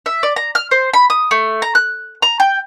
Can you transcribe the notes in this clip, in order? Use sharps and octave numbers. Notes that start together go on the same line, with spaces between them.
E5
D5
A#5
F6
C5
B5
D#6
A3
A#5
F#6
A#5
G5